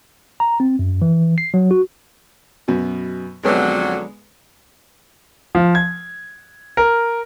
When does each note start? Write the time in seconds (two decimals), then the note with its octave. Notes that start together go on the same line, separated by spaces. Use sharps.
0.40 A#5
0.60 C4
0.79 F#2
1.02 E3
1.38 C7
1.54 F#3
1.71 F#4
2.68 F#2 B2
3.43 F2 D3 F#3 G#3 B3
5.55 F3
5.75 G#6
6.77 A#4